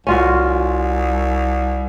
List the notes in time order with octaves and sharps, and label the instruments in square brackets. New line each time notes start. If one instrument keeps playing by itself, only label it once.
[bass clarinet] C2 [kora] C#4 F4 F#4